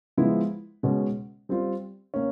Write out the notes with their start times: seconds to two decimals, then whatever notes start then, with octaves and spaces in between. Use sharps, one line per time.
0.17 F3 G#3 B3 E4
0.83 B2 G#3 C#4
1.49 G3 C4 F4
2.14 A#3 C#4